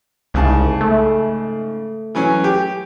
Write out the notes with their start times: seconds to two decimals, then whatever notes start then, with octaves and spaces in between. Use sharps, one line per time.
0.34 C2 G#2 C#3 A5
0.81 A3
2.15 E3 F#3 C#4
2.44 G4